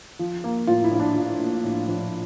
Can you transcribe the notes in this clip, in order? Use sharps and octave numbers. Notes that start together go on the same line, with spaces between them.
F3
A#3
A2 F4
E4
A#1
D4
F3
A#3
A2
A#1